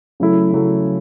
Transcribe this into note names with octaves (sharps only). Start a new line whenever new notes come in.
C#3 F#3 A3 E4 A4
C#3 F#3 A3 E4 A4